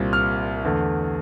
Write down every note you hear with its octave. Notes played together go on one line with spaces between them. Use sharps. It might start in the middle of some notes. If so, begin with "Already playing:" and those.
Already playing: C2 A#2 G3 C4
F6
E2 D3 A3